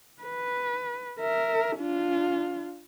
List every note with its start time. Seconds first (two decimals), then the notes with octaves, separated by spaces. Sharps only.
0.22 B4
1.19 A#4 E5
1.77 D4 F4